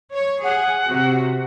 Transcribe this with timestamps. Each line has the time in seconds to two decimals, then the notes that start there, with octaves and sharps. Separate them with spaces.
0.14 C#5
0.44 G#4 F#5
0.84 C3 F#4